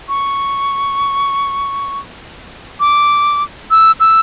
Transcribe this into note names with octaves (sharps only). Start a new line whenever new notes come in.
C#6
D6
E6
E6